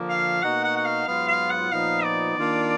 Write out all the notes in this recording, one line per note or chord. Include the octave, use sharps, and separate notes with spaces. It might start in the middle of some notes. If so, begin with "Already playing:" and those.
Already playing: D3 F3 A#3
F5
B2 A#3 D#4 F#4 F#5
F#5
F#5
F5
G#2 F#3 B3 F4 F5
F5
F#5
A#2 F3 B3 D#4 F5
D5
D#3 A#3 D4 F4